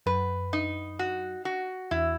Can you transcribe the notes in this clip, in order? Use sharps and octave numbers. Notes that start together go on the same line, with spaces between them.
F#2 B4
D#4
F#4
F#4
E2 E4